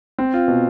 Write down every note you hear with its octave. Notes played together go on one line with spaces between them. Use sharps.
C4
F4
B2